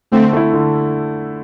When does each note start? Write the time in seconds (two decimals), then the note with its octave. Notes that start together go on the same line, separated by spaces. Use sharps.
0.12 D3 A3 C4
0.33 A3 E4
0.54 D3